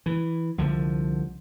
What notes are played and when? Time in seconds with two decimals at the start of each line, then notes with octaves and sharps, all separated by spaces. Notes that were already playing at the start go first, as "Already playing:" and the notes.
0.06 E3
0.58 C2 D3 F3